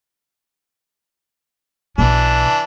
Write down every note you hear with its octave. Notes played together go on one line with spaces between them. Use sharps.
B1 B2 E3 D4